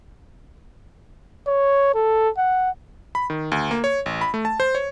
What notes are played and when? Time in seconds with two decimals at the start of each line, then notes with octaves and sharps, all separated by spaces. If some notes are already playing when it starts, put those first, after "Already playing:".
1.47 C#5
1.94 A4
2.37 F#5
3.15 B5
3.30 D#3
3.52 D2
3.71 A#3
3.84 C#5
4.06 A1
4.21 B5
4.34 A3
4.45 A5
4.60 C5
4.75 C#5